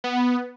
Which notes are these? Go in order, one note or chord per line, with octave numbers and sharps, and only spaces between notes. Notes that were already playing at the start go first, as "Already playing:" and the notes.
B3